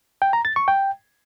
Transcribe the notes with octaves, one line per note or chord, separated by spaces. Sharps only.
G5
A#5
A6
C#6
G5